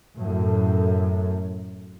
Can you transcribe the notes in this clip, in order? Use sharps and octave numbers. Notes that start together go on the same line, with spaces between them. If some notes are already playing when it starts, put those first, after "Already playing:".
F#2 A2